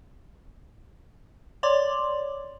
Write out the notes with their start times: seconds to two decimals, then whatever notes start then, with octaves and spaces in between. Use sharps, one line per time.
1.63 C#5 D5 C6 D6